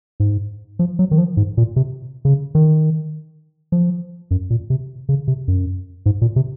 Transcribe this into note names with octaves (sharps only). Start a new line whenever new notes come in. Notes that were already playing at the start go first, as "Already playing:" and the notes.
G#2
F3
F#3
D#3
F3
G#2
A#2
C3
C#3
D#3
F3
F#2
A#2
C3
C#3
C3
F#2
G#2
A#2
C3